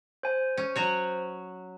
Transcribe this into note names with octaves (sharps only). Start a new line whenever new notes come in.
C5 G#5
C#4
F#3 F#4 C#5